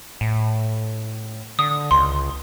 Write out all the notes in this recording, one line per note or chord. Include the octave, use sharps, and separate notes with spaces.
A2
D3 D#6
C#2 C6